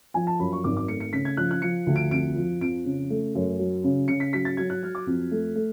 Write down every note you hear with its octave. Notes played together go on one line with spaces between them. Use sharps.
F3 G#5
A5
F#2 B5
C#6
G#1 D6
D6
A3 C#7
C#7
C#3 B6
G#6
F3 F#6
F#6
F3 C#7
D2
D7
F2 D7
F3
F2 D7
C#3
A3
F#2
F#3
C#3
C#3 C#7
B6
F#3 B6
A6
F#3 G#6
F#6
F#3 F6
D6
F2
A3
A3